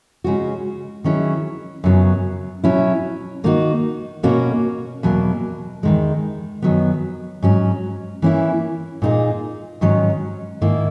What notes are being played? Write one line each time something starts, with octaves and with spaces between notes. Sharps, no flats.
C#3 G#3 C#4 F#4
D#3 F#3 C#4 E4 G#4
F#2 C#3 F#3 B3
B2 F#3 C#4 E4
D#3 A#3 D#4 F#4
B2 A#3 C#4 F#4
E2 B2 F#3 A#3
E2 D#3 G#3
F#2 D#3 F#3 B3
G#2 F#3 C#4
E3 A#3 C#4 E4
A#2 A#3 D#4 G#4
G#2 D#3 F#3 C#4
G#2 D#3 A#3 E4